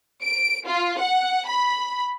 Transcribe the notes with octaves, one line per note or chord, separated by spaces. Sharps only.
D7
F4
F#5
B5